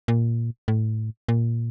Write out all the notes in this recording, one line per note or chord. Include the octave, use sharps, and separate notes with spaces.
A#2
A2
A#2